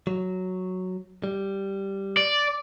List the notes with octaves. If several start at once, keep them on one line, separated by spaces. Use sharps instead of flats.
F#3
G3
D5